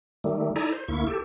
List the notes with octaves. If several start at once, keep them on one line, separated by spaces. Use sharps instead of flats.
D#3 G3 A3
D#4 E4 A4 D5 G#5 A#5
C5
D2 A#3 E4 C#6
G4 A4